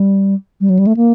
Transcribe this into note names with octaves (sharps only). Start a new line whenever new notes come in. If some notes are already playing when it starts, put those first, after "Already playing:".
Already playing: G3
G3
F#3
G3
A3
A#3